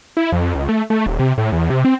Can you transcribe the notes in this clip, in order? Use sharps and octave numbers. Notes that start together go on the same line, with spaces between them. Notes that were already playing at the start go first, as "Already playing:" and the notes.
E4
F2
C#2
A3
A3
D#1
C3
A2
E2
C3
C4